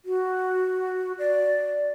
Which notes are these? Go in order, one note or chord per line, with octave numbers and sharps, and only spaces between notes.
F#4
D5